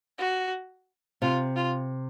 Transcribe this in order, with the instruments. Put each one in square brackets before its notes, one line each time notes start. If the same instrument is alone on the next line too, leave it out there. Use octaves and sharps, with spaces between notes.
[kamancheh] F#4
[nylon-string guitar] C3 [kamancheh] F4
[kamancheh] F4